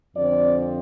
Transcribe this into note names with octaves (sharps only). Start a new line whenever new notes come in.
F2 D3 F3 C4 D5